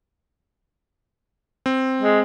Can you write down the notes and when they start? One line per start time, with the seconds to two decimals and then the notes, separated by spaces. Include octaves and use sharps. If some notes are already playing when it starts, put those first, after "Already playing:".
1.66 C4
2.02 G#3